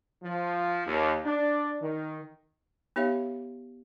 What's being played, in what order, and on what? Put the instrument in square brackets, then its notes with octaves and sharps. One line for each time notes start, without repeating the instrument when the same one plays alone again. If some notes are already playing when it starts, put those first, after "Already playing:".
[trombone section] F3
D#2
D4
D#3
[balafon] B3 D#4 G4 C#5 E5 F5